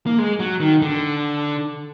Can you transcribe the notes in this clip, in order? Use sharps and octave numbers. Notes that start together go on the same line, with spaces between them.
A#3
G#3
F#3
D#3
D3